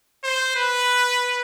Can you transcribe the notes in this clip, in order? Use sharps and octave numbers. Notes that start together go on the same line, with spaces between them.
C5
B4